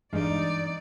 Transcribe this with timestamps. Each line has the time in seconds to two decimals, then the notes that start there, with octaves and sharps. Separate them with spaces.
0.13 G2 E3 G#3 D#4 D5 F5